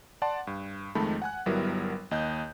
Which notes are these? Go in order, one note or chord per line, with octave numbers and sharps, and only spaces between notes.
D5 F#5 A5 C6
G2
F2 D#3 G#3 A3 A5 B5
F#5 G#5 F#6
G1 F#3 G3 B3 E4 A#4
D#2 D#5 F#6 G6